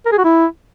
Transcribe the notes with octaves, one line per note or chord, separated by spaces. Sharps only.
A#4
G#4
F#4
E4